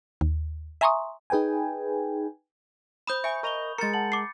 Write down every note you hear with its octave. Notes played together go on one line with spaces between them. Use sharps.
D#2
E5 G#5 A#5 C6 C#6 D#6
D#4 G#4 B4 G5 G#5
C5 B5 D#6 G6 E7
E5 G#5 C#6
A#4 D#5 C#6 F7 G7
G#3 A#4 A#5 A6 C#7
F#5 A5 F#7
D6 C7